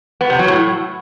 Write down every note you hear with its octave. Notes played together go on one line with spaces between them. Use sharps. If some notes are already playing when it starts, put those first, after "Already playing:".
B3
C3
F#3
A2